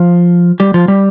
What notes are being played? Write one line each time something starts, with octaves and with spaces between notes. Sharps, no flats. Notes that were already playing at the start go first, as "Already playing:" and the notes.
Already playing: F3 F4
G3 G4
F3 F4
G3 G4